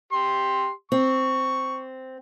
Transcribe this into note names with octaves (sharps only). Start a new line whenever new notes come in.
G4 C6
C4 C#6